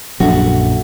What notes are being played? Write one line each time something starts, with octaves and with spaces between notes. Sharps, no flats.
A#1 F#2 F#3 A3 D4 F#4